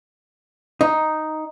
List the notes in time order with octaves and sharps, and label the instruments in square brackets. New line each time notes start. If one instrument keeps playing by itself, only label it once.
[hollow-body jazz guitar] D#4